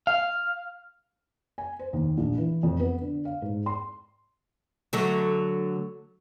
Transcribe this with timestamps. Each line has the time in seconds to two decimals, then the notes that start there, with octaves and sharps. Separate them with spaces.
0.07 F5
1.58 G#5
1.79 C5
1.93 D#2
2.17 A#1
2.38 E3
2.63 F2
2.80 B3
3.01 D3
3.25 F5
3.42 G#2
3.66 C6
4.93 D3 F#3 A3